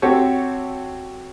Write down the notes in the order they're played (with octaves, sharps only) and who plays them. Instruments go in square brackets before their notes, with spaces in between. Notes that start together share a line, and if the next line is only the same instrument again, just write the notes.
[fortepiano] C4 F#4 G4 A4 C#5